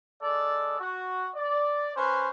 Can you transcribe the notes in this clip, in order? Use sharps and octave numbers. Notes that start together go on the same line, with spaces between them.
G#3 A4 D5
F#4
D5
C#4 B4 C5